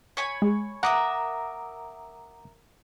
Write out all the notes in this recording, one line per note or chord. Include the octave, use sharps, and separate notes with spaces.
C#5 G#5 B5
G#3
A#4 E5 F#5 A#5 D6 D#6